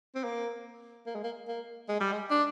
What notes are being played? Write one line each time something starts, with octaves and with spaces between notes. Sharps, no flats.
C4
A#3
A#3
G#3
A#3
A#3
G#3
G3
G#3
D4